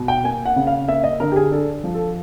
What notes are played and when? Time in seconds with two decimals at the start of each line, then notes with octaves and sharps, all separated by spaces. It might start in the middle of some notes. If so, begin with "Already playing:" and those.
Already playing: B2
0.08 G5
0.24 A#3 G#5
0.45 F#5
0.56 C#3
0.67 F5
0.88 A#3 E5
1.04 D#5
1.20 D3 A#4
1.32 G4
1.36 G#4
1.52 D4 A4
1.84 F3
1.94 A4